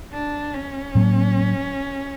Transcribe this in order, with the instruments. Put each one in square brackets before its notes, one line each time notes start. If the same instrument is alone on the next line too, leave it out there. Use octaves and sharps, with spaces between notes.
[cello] D4
C#4
[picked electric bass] A2 F#3 A#3